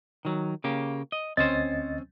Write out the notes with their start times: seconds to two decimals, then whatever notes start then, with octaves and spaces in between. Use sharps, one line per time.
0.25 D#3 F#3
0.64 C#3 A#3 G4
1.12 D#5
1.37 D2 C4 C#4 C5 D#5 A6